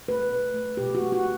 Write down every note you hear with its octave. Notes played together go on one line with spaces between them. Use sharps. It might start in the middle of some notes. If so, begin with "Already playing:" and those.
A3 B4
B2
A3
B2 G4
F#4
A3
F#4